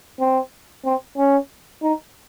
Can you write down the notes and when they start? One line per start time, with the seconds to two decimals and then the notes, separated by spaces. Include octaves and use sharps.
0.20 C4
0.85 C4
1.17 C#4
1.82 D#4